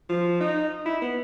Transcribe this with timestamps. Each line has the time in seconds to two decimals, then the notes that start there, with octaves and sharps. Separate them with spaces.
0.09 F3
0.40 D#4
0.86 E4
1.02 B3